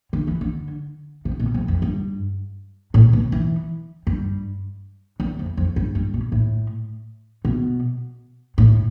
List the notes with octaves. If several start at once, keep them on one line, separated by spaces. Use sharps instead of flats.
D3
E3
D3
C3
B2
F2
F2
G2
A2
B2
E3
G2
E2
F2
F2
G2
G2
B2
A2
B2
A2